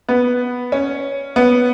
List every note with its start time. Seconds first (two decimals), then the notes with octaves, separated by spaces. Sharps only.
0.09 B3
0.72 C#4
1.36 B3